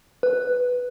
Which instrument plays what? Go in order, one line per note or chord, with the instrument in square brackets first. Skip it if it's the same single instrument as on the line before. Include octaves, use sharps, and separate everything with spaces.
[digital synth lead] B4